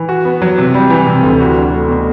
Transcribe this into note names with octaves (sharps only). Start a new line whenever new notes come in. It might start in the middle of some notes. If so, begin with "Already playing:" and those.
Already playing: E3
F#4
B3
F#3
C3
G3
E3
C3
D2
F#4
D4
A3
B2